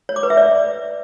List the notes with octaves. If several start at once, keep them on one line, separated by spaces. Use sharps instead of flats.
C#5
D6
B4
E5
D5